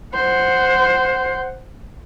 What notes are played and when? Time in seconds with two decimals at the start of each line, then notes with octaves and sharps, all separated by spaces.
0.14 C5 F#5